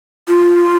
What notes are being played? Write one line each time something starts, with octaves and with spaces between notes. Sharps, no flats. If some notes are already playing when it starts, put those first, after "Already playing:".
F4